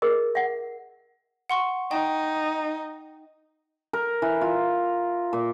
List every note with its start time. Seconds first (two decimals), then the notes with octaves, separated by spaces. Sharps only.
0.02 G#4 A#4 D#5
0.35 E5 F#5
1.50 F#5 C6 C#6
1.91 D#4 G5
3.93 A#4
4.22 E3
4.41 F4
5.33 A#2